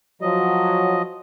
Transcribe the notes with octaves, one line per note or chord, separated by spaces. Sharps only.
F3 F#3 D#5